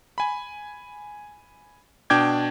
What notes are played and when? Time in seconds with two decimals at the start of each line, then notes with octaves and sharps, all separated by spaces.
0.18 G#5 B5
2.10 B2 D4 G5 D6 G6 G#6